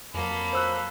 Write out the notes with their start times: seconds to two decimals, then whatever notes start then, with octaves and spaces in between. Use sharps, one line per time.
0.14 F2 F#3 A#3 A4 B5
0.53 C5 E6 F#6